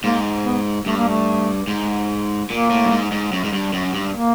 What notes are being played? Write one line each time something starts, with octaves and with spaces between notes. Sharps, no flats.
G#2 A#3
B3
G2 A3
A#3
A3
G#2
A#2 A#3
A2
G2
G#2
G#2
F#2
G#2
G2
F#2
G2
A#3